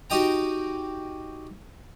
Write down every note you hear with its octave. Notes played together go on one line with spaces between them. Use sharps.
D#4 F#4 G4 D#5 G5 A#5